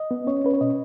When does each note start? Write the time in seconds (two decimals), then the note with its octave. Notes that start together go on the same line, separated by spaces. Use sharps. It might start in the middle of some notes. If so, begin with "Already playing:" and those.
Already playing: D#5
0.11 B3
0.27 C#4 C#5
0.44 C#4 B4
0.53 C#5
0.61 B2 D#5